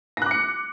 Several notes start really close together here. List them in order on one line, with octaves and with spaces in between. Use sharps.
A#6 F#6 D6 C#7